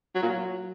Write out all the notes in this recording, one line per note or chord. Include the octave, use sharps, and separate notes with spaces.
F#3
A#2
F#3